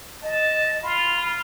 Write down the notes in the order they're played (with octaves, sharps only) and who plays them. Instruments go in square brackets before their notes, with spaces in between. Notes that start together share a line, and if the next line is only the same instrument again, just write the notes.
[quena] D#5 [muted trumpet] A5
[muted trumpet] F4 [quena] B5